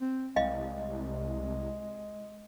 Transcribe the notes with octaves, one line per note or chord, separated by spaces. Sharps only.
C4
C2 G#3 D#5 F5 G5